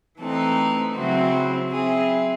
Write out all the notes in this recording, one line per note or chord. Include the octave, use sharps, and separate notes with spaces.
E3 A3 C4 D#4 A4
C#3 F#3 C4 E4 F#4
F#3 C4 E4 G#4